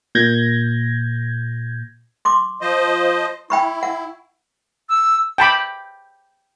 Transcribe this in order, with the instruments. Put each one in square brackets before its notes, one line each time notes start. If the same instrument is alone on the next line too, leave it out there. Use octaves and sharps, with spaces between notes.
[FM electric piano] A#2 G6 G#6 A#6
[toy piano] C6 D6
[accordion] F3 C5 D#5
[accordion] E4 [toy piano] G5 B5 C#6
[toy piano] F#5
[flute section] E6
[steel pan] G5 A5 B5 D6